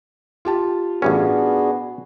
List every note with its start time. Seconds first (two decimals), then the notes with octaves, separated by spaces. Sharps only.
0.45 F4 G4 A5
1.02 A1 G2 B3 C#4 D4 F#4 G#4